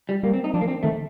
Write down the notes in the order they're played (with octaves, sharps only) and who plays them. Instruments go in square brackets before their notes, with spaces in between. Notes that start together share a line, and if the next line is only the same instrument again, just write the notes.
[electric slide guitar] G3
[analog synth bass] G3 [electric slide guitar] A#3
[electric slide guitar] C4
D#4
[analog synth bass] F3 [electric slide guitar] D4
[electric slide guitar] A#3
C4
[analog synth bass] D#3 [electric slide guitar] A3